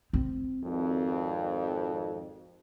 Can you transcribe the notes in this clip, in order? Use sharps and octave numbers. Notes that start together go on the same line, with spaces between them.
C4
G#1 F2